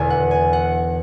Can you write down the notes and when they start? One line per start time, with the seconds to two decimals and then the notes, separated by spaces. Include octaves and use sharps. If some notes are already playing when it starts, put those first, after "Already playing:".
Already playing: E1 E2 D3 G#5
0.10 F#5
0.31 G#5
0.53 F#5